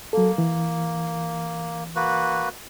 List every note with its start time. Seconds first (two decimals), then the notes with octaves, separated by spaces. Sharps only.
0.13 F#3 A#3 A4
0.38 E3
1.95 A#3 F#4 B4